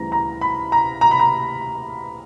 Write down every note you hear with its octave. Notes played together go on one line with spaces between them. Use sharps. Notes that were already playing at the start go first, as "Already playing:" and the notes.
Already playing: D2 C#3 E3 G3 C4 A#5
A#5
B5
A#5
A#5
B5
A#5